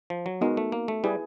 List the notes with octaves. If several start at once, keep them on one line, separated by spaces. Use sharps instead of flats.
F3
F#3
G#3 B3 D#4 F#4 A#4
A3
A#3
A3
G3 E4 G#4 B4